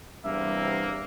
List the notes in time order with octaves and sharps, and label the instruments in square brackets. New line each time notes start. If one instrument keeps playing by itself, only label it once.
[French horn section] E2 C3 [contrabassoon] G2 [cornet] A#3 [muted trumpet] E5